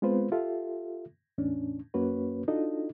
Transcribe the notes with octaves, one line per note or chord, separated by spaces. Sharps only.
G#3 B3 C4 F4 B4 C5
F4 G4 A4 E5
E2 A2 C#4 D4
F#2 A#3 C#4 F#4 B4 C#5
D4 D#4 F4 F#4 A4 D#5